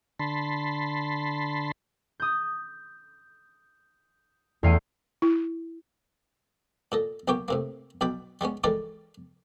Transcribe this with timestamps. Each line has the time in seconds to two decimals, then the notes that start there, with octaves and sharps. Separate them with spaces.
0.19 D3 A5 B5 C6
2.20 D#6 G6
4.63 E2 A3 F5 G5 C#7 D#7
5.22 E4
6.92 A#2 A4 D#5
7.28 B1 A#3 B3 G4 C#5 G5
7.48 A2 C3 A#3
8.01 B1 B2 D5 G5 B5
8.41 G3 G#3 B3 C#4
8.64 E3 G3 G#3 A4 A#4 D5